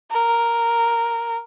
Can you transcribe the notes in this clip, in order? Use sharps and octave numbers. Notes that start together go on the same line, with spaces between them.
A#4